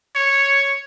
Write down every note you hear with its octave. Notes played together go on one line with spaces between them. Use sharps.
C#5